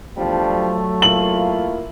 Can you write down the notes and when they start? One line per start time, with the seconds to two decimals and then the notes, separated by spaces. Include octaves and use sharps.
0.17 E2 F3 G3 A3 D4
0.48 F#3
1.02 A#3 E4 F4 F#7